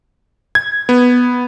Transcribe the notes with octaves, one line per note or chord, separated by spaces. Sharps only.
G#6
B3